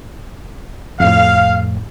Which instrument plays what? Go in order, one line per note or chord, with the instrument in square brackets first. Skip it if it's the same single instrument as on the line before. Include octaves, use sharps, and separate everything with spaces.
[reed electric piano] F2 A2 [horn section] F5